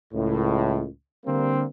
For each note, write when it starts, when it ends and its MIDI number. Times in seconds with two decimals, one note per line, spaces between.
0.13 0.87 37
0.13 0.87 45
1.25 1.65 50
1.25 1.65 55
1.25 1.65 58
1.25 1.65 60